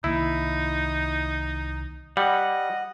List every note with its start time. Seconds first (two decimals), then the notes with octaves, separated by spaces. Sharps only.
0.04 C2 D#3 A#3 D#4 E4
2.17 G3 D#5 F#5